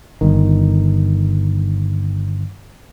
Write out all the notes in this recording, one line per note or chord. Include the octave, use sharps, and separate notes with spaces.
G1 D#3